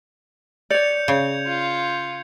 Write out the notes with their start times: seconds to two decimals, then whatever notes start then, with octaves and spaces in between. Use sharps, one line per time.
0.70 C#5 D5 G6 C#7 F7
1.08 C#3 G#6
1.47 F4